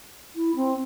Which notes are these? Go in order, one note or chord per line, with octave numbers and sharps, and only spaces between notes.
E4
C4